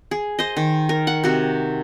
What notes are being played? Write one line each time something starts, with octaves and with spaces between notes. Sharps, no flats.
G#4
C5 D#5
D#3
A#4
F#5
C3 F#4